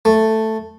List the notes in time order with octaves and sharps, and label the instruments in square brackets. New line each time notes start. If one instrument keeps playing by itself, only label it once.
[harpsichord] A3